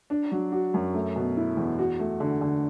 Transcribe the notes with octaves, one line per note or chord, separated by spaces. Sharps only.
D4
F#3
F#4
F#2
A3
B2
E4
E2
F#4
A3
D3
D3